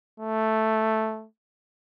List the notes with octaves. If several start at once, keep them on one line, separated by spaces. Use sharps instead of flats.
A3